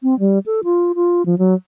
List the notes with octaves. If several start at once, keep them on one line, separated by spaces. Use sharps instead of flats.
C4
G3
A4
F4
F4
F3
F#3